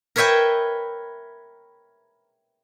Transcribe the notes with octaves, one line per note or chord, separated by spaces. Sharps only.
A#4 B4 C#5 E5 G5 G#5